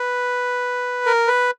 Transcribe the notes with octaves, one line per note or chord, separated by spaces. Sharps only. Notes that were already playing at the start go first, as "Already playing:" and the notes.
Already playing: B4
A#4
B4